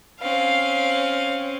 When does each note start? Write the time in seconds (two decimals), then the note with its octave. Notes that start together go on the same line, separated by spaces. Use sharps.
0.22 C4 C#4 F5